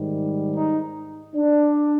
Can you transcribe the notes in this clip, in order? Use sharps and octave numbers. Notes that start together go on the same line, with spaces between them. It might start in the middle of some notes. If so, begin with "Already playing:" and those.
Already playing: G#2 D#3 G3
D#4
D4